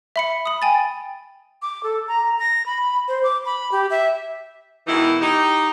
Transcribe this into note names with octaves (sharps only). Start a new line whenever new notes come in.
E5 B5 C#7
B5 D#6
G5 G#5 A6
D6
A4
A#5
A#6
B5
C5
D6
B5
G4
E5
B2 D#3 E3 G#3 D#4 E4
D#4 G4